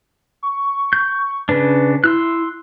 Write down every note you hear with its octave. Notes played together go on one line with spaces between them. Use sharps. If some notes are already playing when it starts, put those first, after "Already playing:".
C#6
G6
C#3 D4 B4
E4 C6 E6 F#6